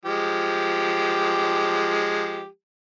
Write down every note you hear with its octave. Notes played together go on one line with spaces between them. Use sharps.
F3 G#3 G4